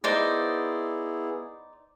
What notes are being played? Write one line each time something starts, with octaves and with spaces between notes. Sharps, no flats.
B3 D#4 E4 G#4 C5 D5